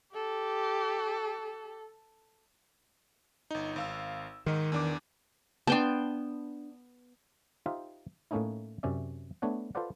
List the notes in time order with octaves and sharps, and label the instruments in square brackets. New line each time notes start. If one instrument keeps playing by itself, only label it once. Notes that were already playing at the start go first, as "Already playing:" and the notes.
[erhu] G4 [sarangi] A4
[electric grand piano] G1 D#4
G#1 F5 E6
[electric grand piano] G#2 D#4 [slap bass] D#3
[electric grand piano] E2 D4 D6
[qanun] B3 G5 C6 [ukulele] D4 A5
[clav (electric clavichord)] D#4 F4 G4 C5 E5 F5
A2 A3 A#3 C#4 D#4 E4
F#2 C3 C#4 D5 E5
A3 B3 D4 C#5 F#5
F4 A4 B4 C5 D5 F#5